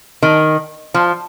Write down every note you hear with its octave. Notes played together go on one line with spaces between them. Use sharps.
D#3
F3